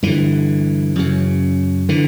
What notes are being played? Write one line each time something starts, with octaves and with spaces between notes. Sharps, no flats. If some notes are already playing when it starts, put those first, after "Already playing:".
G2 D3 E3
F#2 C#3
D3 E3